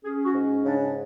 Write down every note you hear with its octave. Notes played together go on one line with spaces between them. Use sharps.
C#4 G#4
F#4
G#2
C#3 D4